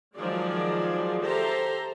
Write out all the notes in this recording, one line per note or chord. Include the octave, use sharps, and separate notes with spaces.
D#3 F3 F#3 G#3 G#4 D5
G4 A4 C5 E5 A#5